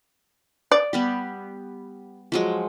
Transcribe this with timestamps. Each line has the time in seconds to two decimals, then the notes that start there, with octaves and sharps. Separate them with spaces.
0.72 D5
0.93 G3 B3 G4
2.32 F3 F#3 G#3